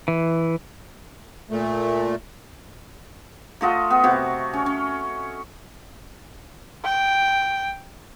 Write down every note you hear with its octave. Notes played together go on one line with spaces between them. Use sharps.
E3
A#2 A3
A3 F4 D#5 F#5
B3
C3 F#4 F#5
C#4
C#4
G5